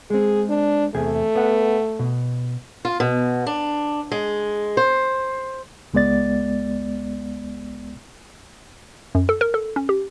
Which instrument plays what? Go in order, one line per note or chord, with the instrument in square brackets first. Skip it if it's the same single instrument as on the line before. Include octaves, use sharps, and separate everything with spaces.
[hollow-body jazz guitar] G#3 C4 [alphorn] G#4
[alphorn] D4
[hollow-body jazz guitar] E2 C3 G#4 [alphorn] A3
[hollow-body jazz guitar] B3 F#5
B2
[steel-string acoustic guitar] F4
B2
D4
G#3
C5
[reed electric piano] C#2 G#3 B3 D5 A6
[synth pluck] F#2
A4
A#4
A4
C#4
G4